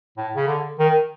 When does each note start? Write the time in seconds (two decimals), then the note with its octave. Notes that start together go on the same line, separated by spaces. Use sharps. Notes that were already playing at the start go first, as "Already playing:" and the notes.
0.17 A2
0.36 C#3
0.48 D3
0.79 D#3